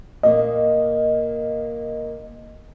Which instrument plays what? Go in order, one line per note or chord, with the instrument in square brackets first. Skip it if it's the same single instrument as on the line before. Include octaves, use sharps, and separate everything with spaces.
[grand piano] A#2 A#3 [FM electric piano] D#5